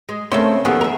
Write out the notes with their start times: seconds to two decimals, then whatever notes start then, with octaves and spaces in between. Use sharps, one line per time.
0.09 G#3
0.32 C#3 A3 C4 C#4 A#4 E5 C6
0.65 D#2 D#3 F3 B3 G#4 A4 F#5
0.81 A#4 E5